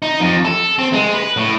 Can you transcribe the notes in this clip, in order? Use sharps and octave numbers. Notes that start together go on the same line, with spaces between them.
D#4
F2
A4
C4
G#3
B4
A2